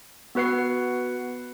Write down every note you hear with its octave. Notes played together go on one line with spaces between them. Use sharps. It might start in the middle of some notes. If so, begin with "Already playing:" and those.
B3 F#4 B4 F#5 C7